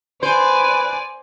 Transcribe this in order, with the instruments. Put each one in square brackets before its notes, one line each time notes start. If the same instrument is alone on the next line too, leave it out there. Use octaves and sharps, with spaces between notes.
[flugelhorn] B4 [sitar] C5 [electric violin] D5 G#5